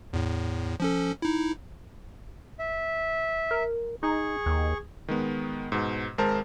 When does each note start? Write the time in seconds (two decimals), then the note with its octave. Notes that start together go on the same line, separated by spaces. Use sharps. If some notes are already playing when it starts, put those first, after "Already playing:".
0.13 E2 A2
0.80 F3 C#4 A4
1.22 D#4 E4
2.59 E5
3.51 A#4
4.03 D#4 G#4 C#6
4.46 D#2
5.08 D#3 G#3 B3
5.72 G#2 B2
6.18 G#1 G#3 A#4 C5 A5